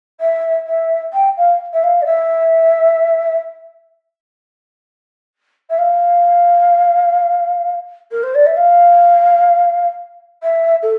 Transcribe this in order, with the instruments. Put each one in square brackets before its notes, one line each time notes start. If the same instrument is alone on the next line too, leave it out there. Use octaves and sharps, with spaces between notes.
[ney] E5
E5
G5
F5
E5
F5
D5
E5
E5
F5
A#4
C5
D5
E5
F5
E5
A4